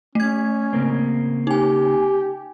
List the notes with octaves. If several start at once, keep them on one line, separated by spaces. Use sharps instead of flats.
A3 C#4 G#6
C#3 A#3 C4
D#4 G4 G#5